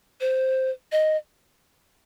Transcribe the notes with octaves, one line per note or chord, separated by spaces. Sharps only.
C5
D#5